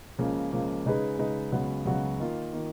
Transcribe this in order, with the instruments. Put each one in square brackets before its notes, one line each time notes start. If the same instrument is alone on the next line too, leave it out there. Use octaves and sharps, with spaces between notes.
[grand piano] C#2 C#3 F3 A#3
C#2 C#3 F3 A#3
C#3 G#3 D#4 G#4 B4
C#3 G#3 D#4 G#4 B4
C#2 C#3 F#3 B3 F#4
C#2 C#3 F#3 B3 F#4
D#3 A#3 F4
D#3 A#3 F4